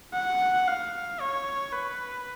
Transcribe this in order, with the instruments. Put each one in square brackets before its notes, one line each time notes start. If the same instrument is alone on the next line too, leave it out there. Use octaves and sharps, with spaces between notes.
[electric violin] F#5
F5
C#5
B4